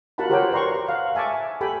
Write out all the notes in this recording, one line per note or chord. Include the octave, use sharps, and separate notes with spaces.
F4 F#4 A#4 F#5 A5 B5
G4 A#4 C5 C#5 F#5 G5
B4 D5 A#5 C6 C#6
F5 F#5
E5 G#5 A5 C#6 D6
G4 A4 G5 G#5 B5